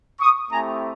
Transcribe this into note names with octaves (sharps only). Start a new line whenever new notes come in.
C#6 D#6
A3 C4 E4 G4 G#5 A#5